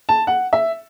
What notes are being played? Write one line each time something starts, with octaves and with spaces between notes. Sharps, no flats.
A5
F#5
E5